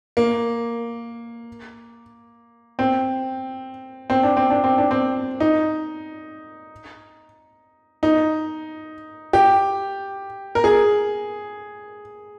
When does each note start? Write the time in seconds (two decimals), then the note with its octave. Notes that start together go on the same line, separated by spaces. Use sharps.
0.17 A#3
2.79 C4
4.10 C4
4.23 D4
4.37 C4
4.50 D4
4.64 C4
4.78 D4
4.91 C4
5.40 D#4
8.03 D#4
9.33 G4
10.55 A#4
10.64 G#4